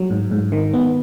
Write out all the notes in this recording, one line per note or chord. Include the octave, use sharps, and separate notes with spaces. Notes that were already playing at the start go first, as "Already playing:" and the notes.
Already playing: F#3
G#2
G#2
D#3
B3